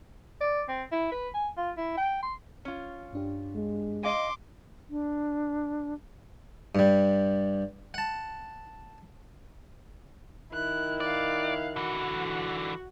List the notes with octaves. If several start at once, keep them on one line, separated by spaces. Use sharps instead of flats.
D5
C4
E4
B4
G#5
F4
E4
G5
C6
C#4 F4
G2 D4 G4
G#3
D#5 F5 G#5 C6 D6
D4
G2 G3
F#5 A5
D#3 E4 F#6
D5 F5 F#6
D3 E3 F#4 F#5